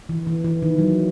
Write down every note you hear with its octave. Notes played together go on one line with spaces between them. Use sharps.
E3
E3
E3
D#3
F#3